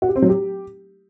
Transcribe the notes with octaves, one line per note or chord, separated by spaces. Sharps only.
F#4
G4
C4
F#3
G4